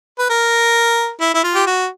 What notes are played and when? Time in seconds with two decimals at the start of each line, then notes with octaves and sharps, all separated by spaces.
0.19 B4
0.30 A#4
1.21 E4
1.34 E4
1.44 F4
1.55 G4
1.67 F#4